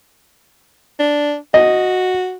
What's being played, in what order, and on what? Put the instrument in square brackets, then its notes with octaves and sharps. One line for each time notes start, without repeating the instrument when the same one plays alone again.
[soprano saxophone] D4
[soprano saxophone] F#4 [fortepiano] D#5